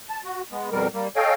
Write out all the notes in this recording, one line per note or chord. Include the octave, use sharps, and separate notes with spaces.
A5
F#4
G#3 B3
F2 B2 G3 A#4
G3 A#3
A4 C#5 D#5 F5 G5 G#5